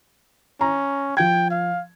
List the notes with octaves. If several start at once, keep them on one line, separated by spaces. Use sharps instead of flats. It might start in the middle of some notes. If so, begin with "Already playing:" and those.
C#4 A#5
F3 G5 G#6
F5